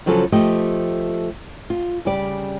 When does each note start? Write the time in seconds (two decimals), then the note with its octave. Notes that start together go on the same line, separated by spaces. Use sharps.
0.06 C#3 F3 F#3 C#4 A4
0.32 F3 A3 G4 D#5
1.70 F4
2.05 C#3 G3 G4 D5